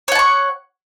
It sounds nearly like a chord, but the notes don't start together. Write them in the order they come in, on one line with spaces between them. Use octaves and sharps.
C#5 F#5 A5 C#6